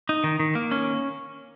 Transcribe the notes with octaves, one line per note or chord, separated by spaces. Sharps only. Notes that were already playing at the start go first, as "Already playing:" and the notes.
D#4
D#3
D#3
A#3
C#4